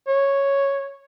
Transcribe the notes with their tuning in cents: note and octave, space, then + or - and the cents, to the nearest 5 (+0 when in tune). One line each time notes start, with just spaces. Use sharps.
C#5 -5